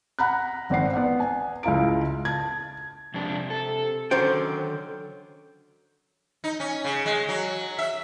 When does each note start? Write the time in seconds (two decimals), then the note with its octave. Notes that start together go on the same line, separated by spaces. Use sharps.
0.19 F#5 A#5 B5 F#6
0.70 G#1 C4 D5 F#5 C7
0.93 B3 D5 F#5
1.20 G#5
1.63 C#2 E4 F4 A#5 D7
2.25 A5 G#6
3.14 F2 C3 D4
3.50 A4
4.11 D3 D#3 F#3 C#4 C5 G5
6.44 D#4
6.60 C#4
6.84 C#3
7.06 G#3
7.29 F#3
7.78 E5